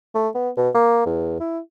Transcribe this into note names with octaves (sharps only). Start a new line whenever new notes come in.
A3
B3
B2
A#3
E2
E4